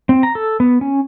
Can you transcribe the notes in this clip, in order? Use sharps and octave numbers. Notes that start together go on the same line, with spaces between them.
C4
A#5
A4
B3
C#4